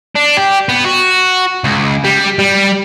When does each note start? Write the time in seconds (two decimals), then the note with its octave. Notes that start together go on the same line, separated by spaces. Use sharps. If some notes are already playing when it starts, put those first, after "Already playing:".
0.15 D4
0.37 G4
0.69 B3
0.85 F#4
1.64 C#2
2.05 G3
2.39 G3